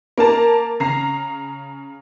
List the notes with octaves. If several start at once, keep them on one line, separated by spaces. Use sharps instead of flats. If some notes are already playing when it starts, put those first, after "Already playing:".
A#3 A#4 A5 A#5
C#3 A#5 C7